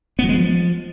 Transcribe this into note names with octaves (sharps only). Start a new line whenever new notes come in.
B3
F#3
G#3
F3